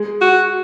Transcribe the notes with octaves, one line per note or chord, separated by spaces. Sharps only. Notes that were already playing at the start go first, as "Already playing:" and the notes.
Already playing: G#3 G#4
F#4